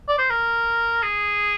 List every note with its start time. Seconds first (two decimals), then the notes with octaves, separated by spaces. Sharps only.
0.08 D5
0.18 C5
0.30 A#4
1.03 G#4